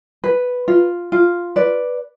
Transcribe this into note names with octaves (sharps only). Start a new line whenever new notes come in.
B4
F4
F4
B4 D5